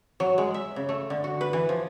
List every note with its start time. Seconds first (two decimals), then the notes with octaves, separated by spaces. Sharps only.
0.20 F#3
0.38 G#3
0.54 E5
0.76 C#3
0.89 A3
1.10 D3
1.24 F#4
1.41 B4
1.53 E3
1.69 F3